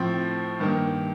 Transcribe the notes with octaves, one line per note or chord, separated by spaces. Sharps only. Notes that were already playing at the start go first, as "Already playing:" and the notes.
Already playing: A2 F3 C4
G2 D#3 A#3